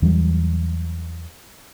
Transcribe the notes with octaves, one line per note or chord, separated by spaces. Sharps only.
E2 E3 F#3 G3